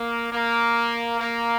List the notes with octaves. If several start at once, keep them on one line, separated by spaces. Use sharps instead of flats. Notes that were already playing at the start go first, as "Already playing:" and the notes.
Already playing: A#3
A#3
A#3